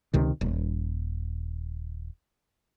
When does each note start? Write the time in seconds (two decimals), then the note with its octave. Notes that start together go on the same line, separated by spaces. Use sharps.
0.14 C#2 C3 D#3
0.41 D#1